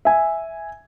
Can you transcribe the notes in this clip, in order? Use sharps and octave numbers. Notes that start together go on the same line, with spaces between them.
E5 G#5